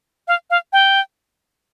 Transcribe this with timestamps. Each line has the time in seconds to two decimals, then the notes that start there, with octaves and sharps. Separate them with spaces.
0.28 F5
0.50 F5
0.73 G5